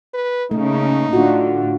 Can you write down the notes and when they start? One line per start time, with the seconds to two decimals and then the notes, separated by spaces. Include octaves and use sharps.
0.14 B4
0.51 C#3 A3 A#3 D#4
1.13 A2 D3 D4 F4 F#4